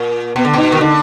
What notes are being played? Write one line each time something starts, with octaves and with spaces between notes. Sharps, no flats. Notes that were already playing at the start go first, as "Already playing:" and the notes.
Already playing: A#2
B2 B3
D3
B2 D#4
D#3
D3 D#4